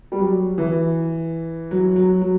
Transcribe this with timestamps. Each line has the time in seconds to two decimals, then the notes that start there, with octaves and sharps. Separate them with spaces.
0.12 G3
0.19 F#3
0.58 E3
1.71 F#3
1.96 F#3
2.22 F#3